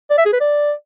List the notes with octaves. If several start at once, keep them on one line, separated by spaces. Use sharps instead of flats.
D5
E5
G#4
B4
D5